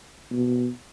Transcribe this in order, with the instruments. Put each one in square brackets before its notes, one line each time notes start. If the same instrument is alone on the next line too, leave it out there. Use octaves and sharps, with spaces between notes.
[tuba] B2